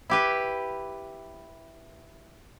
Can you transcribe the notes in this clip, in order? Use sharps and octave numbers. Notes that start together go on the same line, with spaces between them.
E4 G4 B4